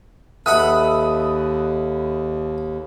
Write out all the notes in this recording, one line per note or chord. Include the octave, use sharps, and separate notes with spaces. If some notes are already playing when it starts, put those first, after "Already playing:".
D#2 A4 B4 D#5 E5 F#5 B5 D#6